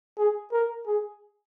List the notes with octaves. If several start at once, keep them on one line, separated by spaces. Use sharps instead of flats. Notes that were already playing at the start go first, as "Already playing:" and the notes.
G#4
A#4
G#4